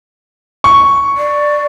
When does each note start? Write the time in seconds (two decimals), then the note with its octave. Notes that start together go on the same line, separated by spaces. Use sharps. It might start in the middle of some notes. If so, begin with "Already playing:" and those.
0.64 C#6
1.17 D5